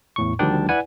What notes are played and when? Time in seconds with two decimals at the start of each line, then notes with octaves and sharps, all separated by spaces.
0.16 E2 A2 C#6
0.39 D2 D#3 F3 G3 D4 G5
0.69 E4 B4 D5 F#5 G#5